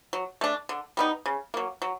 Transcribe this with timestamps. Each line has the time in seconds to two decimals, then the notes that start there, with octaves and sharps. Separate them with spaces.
0.13 F#3
0.41 A3 D4
0.69 D3
0.97 G3 B3 D#4
1.26 C#3
1.54 F#3 A#3
1.82 F#3